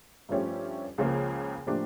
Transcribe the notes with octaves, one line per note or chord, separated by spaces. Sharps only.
G2 F3 A3 C#4 G4
C#2 C#3 F3 A#3
A2 F3 A#3 D4 G4